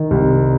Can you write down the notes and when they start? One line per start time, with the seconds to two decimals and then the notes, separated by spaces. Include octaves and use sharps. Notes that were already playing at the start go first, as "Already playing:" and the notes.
Already playing: D#3
0.11 C2